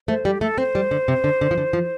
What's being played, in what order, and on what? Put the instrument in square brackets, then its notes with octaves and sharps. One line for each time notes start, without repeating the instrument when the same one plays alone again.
[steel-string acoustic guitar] A3 [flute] C5
[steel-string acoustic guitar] G3 [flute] G4
[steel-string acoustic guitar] A3 [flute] A4
[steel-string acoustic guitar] C4 [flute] C5
[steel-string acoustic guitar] G3
D3
C3
D3
D3
F3
D3
F3